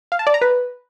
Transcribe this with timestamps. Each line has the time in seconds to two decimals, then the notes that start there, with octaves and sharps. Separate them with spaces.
0.12 F5
0.19 A5
0.27 D5
0.34 A#5
0.41 B4